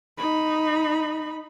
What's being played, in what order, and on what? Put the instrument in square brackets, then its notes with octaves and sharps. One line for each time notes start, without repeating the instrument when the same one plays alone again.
[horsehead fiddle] D#4 B5